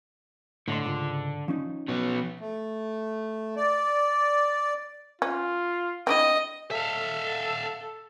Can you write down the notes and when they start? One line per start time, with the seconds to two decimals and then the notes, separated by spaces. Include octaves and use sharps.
0.68 A2 D3 D#5 C6
0.84 C#2 G#2 F4
1.48 F3 C#4 D#4
1.88 B2 F#3 B3
2.40 A3
3.57 D5
5.22 C#4 F4
6.07 C4 D4 E4 D#5
6.71 A4 E5 F5